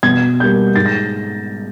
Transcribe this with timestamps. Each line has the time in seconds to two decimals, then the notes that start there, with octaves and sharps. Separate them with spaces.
0.03 B2 G#6
0.40 G3 A#3 G6
0.75 G#2 A6
0.86 A#6